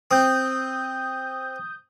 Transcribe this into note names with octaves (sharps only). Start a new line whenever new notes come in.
C4 D#6 G6